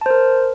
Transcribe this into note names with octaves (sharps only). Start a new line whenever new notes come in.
A#4 C5 A5